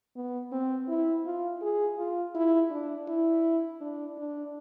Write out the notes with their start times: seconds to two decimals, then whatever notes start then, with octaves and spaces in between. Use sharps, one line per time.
0.16 B3
0.52 C4
0.88 E4
1.26 F4
1.62 G#4
1.98 F4
2.35 E4
2.71 D4
3.08 E4
3.81 D4
4.18 D4